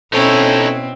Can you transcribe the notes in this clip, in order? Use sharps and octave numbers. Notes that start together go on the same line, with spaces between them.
B2 C4 C#4 D#4 E4 A4 C#5